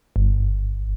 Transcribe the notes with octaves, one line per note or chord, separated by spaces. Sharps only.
G1